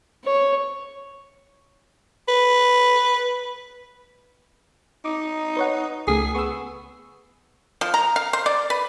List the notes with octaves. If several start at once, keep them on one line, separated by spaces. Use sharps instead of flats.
C#5
B4
D#4 D6
B4 C#5 F#5
C#2 C#3 A3 G#4
B3 C#6 E6
F3
A#5
F5
C5
D5
B4